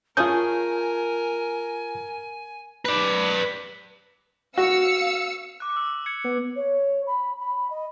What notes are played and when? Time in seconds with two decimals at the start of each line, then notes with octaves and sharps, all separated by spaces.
0.17 A3 C#4 F4 G#4 A#4 G#5 G6
2.85 B4 D5
4.58 F#4 F5 E6 C#7
5.60 D6 F#6
5.76 E6
6.06 G#6 C#7
6.24 B3
6.56 C#5
7.07 B5
7.40 B5
7.70 D#5